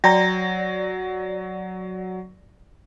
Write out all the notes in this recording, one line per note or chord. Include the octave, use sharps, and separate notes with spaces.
F#3 D5 G5 A#5 A#6